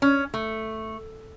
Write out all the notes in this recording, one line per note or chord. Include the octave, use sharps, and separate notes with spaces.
C#4
A3